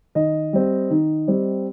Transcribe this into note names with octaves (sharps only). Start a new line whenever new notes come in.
D#3 D#5
G3 C4
D#3
G3 C4